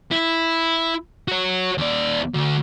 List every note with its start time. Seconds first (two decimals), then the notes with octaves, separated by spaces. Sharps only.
0.11 E4
1.28 F#4 C#5
1.78 D#2 D5
2.35 D2 D3